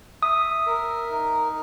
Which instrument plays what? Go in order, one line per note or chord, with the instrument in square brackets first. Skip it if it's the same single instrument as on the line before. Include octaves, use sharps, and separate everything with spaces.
[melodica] E5 [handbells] D#6
[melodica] A#4
D#4